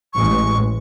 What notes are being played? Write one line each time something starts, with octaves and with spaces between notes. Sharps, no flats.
A1 G#3 C#6